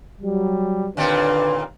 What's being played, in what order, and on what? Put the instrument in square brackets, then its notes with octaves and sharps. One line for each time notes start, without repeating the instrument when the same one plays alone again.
[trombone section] F#3 G3
[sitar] D#2 A#2 C4 [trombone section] D3 D4 B4